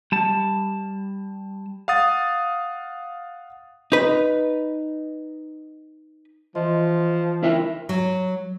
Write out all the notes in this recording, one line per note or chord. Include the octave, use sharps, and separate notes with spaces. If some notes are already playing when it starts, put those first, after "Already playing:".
G3 A5
F5 F#5 D#6 A6
D#4 B4
E3 F3 D#5 C6
E4 A#4 E5
F#3